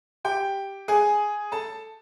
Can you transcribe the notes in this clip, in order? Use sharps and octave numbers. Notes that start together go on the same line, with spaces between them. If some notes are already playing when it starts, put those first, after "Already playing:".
G4 G5
G#4 G#5
A4 A5